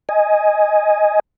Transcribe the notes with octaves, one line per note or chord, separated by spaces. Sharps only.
D#5 G#5